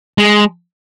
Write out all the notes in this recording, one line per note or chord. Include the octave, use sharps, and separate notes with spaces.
G#3